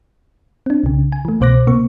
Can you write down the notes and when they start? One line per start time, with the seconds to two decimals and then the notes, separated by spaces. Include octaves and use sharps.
0.66 C4 D4
0.84 C2 C#3
1.12 G#5
1.25 E3 A3
1.40 C2 B2 C5 D6 F#6 A#6
1.67 C3 A#3 C#6